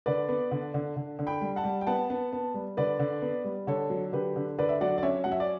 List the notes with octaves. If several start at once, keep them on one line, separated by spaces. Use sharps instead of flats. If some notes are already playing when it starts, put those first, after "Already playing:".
D3 B4 D5
B3
D3
D3
D3
D3
G5 B5
G3
F#5 A5
G3
G5
B3 F#5 A5
B3
B3
G3
D3 B4 D5
D3
B3
G3
D3 A4 C#5
F#3
D3 G4 B4
D3
D3 B4 D5
E5
F#3 D5 F#5
D5
C#4 C#5 E5
F#3 F#5
E5
D5